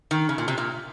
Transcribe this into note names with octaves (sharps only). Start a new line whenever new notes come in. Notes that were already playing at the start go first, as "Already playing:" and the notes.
D#3
C#3
A#2
C3
A#2